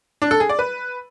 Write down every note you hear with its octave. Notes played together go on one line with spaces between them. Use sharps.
D4
A4
G#4
D5
B4